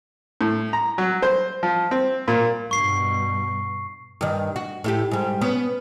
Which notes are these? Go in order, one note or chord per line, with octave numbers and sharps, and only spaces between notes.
A2
A#5
F#3
C5
F3
C4
A#2
G2 B2 C#6 C7
G2 D#3
F#4
A2 E4 G4
G#2 G3
B3 C#4